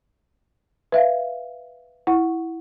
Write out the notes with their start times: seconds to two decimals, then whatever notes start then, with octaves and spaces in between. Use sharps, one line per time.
0.92 B4 E5 F5
2.07 E4 F#5 C#6